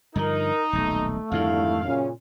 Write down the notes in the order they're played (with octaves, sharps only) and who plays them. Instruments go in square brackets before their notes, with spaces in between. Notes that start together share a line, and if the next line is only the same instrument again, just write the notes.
[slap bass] G2 D3 F3 [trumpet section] D#4 [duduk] A#4
[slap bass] D#1 B1 [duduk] A3
[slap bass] F2 G#2 D#3 [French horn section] D3 G3 E4 [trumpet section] F5
[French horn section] F#2 C#3 C#4 [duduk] A#2